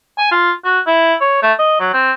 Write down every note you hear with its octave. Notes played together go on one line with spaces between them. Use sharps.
G#5
F4
F#4
E4
C#5
A3
D#5
F#3
C4